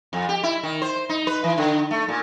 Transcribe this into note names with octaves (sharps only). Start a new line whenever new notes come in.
F2
G4
E4
D#3
C5
D#4
B4
E3
D3
A3
A#2